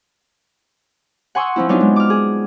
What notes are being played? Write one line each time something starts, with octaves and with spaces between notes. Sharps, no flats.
F#5 G#5 C6 C#6 D#6 E6
F3 C4 E4
F#3 B3 C4 D4 D#4 F4
G#3
D6 F6
G#4